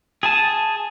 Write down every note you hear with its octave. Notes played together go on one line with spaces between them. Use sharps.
G#4 G#5 A5